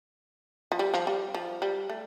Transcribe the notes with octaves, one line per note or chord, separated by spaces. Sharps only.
F3
G3
F3
G3
F3
G3
A3